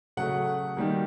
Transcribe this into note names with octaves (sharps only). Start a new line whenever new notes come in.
C#3 F#3 A3 F#5
D#3 G3 A#3